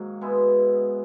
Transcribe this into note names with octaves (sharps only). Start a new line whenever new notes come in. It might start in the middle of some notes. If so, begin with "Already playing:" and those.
Already playing: G#2 D#3 F#3 A#3
B2 G#3 B3 E4